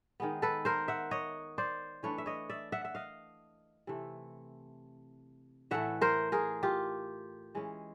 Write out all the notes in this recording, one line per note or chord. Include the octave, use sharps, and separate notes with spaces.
D#3 G#3 B3
A4 B4
A#4 C5
E5 F#5
C#5 D#5
C5 D5
E3 A3 D4 B4 C#5
E5
C#5 D#5
D5 E5
E5 F#5
E5
D#5 F5
C3 E3 A3
A2 E3 A3 E5 F#5
A#4 C5
G#4 A#4
F4 G4
E3 G#3 C#4